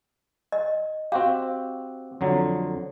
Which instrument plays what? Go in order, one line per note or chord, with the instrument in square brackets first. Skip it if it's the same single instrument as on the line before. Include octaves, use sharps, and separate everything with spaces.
[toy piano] D#5
[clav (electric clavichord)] C4 F#4 G4 [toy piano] F5
[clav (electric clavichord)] F2 D3 F#3